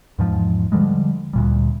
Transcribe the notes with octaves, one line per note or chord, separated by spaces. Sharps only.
E2 G#2 F3
D3 F3 G3 G#3
D2 A#2 G3